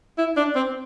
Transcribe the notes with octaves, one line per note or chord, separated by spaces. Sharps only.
E4
D4
C4